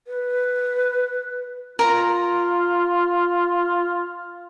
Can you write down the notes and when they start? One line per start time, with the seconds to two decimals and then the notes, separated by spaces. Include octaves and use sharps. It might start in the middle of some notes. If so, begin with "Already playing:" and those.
0.07 B4
1.79 F4 A#4 A#5